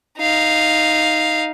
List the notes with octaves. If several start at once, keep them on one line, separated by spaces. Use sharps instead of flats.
D#4 F5